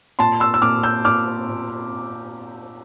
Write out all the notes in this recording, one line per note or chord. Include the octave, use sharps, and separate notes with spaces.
A#2 A5 C6
C6 E6
E6
A#2 D6 F6
E6 G6
A#2 D6 F6
A#2